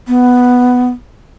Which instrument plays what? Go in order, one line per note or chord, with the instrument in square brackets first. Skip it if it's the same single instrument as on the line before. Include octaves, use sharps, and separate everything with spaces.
[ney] B3